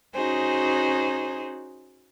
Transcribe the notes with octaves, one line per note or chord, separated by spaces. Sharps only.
C#4 D#4 F#4 G#4 C5